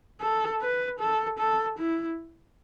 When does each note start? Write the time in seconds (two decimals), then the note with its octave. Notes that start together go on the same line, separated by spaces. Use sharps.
0.21 A4
0.61 B4
0.99 A4
1.39 A4
1.78 E4